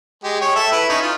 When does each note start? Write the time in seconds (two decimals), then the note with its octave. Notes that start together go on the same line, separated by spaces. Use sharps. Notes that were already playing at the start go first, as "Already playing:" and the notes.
0.24 G#3 G4
0.41 C#5 G5
0.56 A4 E5
0.72 E4 B4
0.89 C#4 D#4 C#5
1.02 F4